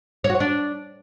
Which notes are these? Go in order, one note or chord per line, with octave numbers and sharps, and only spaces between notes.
C#5
F#4
C#5
D4